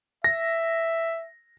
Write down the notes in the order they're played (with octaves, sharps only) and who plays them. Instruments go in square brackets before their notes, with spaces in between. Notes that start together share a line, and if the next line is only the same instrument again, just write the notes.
[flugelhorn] E5 [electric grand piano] A#6